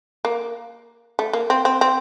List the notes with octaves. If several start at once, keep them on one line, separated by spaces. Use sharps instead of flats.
A#3
A3
A#3
C4
C4
C4